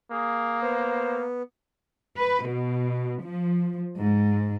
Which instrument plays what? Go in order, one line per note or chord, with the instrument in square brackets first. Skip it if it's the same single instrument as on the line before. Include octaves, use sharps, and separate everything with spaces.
[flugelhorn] A#3 [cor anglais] G#4
[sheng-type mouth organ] B3 [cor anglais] C5
[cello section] B4
B2
F3
G#2